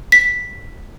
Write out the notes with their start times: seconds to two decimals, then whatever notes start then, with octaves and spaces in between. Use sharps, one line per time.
0.12 B6